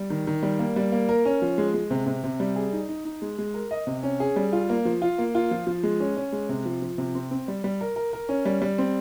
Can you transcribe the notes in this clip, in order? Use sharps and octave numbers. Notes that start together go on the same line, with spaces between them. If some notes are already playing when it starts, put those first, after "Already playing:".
Already playing: G3
D#3
D#3
G3
A#3
G3
A#3
A#4
C#4
F3
G#3
G#3
C3
C3
C3
G3
G#4
D#4
D#4
D#4
G#3
G#3
A#4
D#5
C3
C#4
G#4
G3
F4
A#3
F3
F4
A#3
F4
F3
F3
G#3
C#4
C#4
G#3
C3
F3
F3
C3
C4
C4
G3
G3
A#4
A#4
A#4
C#4
G3
G3
C4